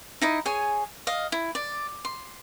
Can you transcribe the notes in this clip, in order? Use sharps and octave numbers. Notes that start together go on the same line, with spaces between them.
D#4 E4 D#5
G#4 C#5 G#5
D#5 F5
E4
D5
C6